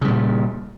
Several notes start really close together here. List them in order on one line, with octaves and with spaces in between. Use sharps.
C#3 G3 A#2